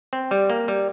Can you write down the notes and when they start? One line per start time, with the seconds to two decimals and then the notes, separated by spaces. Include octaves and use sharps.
0.13 C4
0.31 G3
0.50 A#3
0.68 G3